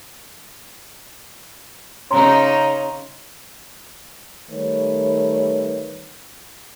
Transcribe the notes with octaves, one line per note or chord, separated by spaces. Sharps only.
C#3 C#4 D#4 A#5 C6
D#3 G3 A3 B4 C#5